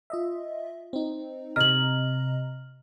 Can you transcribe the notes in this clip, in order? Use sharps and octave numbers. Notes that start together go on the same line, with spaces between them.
F4 D#5 E5
C4 D#4
C3 D#5 A#5 F6 F#7